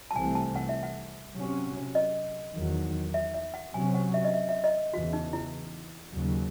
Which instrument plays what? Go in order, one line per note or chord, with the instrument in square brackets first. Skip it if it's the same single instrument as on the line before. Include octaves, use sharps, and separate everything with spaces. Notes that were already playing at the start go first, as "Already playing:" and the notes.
[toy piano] A5
[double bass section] C2 C3 E3 A3 C4 [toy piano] G#5
[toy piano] A5
F#5
E5
F#5
[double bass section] C3 F#3 C#4
[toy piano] D#5
[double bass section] E2 D#3 F#3
[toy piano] E5
E5
F#5
[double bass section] C3 F#3 C#4 [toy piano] G#5
[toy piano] F#5
E5
D#5
E5
E5
D#5
[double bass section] E2 C#3 E3 [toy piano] F#4
[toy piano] D#4
E4
[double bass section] D#2 C#3 F#3